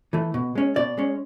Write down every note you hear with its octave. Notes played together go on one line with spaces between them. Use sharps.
E3 A3
B2
G#3 C#4
B2 D5
G#3 C#4